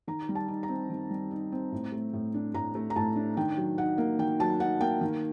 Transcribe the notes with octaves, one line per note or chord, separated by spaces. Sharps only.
D#3 A#5
G3
A5
D#4
A#5
C4
D#3
G3
D#4
C4
A2
A3
A2
D4
A2 A#5
A3
A#5
A2 A5
D4
D#3 G5
F#3
D#4 F#5
A#3
D#3 G5
F#3 A5
D#4 F#5
A#3 G5
D#3